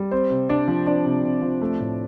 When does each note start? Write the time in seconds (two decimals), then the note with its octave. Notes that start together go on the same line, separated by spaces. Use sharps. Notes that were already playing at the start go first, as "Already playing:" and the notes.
Already playing: G3
0.11 C4 C5
0.30 C3
0.49 C3 D4 D5
0.68 F3
0.86 C4 D4 D5
1.05 C3
1.24 C3
1.42 F3
1.61 A3
1.80 A2